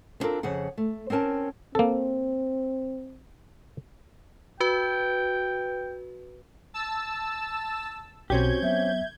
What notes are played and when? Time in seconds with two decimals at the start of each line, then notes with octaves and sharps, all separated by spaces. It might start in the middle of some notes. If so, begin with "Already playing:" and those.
0.20 B3 C4 D4 F4 A4 A#4
0.43 F2 C#3 G#4 F#5
0.77 A3
1.10 C4 C#4 A#4 G#5 A5
1.75 A#3 C4 A4
4.60 F#4 B4 G5
6.74 A5 E6
8.30 B1 B2 C4 C#4 F#4 G4 G6 G#6
8.63 F#3 B3 E5